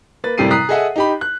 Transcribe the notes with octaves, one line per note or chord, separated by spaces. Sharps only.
A#3 B4 A6
F#1 A2 C3 G3 C7 D#7
A#5 D#6 F#6 B6 C7
G#4 A4 D#5 E5 F#5
D#4 G4 B5
F#6